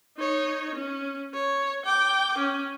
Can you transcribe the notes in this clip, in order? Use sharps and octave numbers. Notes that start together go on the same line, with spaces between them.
D#4 C#5
C#4
C#5
G5 D6
C#4